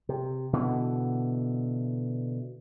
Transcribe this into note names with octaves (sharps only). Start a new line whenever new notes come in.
C3
B2 D3 E3